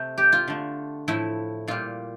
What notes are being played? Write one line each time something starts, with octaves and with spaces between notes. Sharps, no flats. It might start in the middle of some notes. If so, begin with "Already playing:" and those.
Already playing: C3 A3
G4
F4
D3 A3
A2 F3 A3 E4
A#2 G3 F4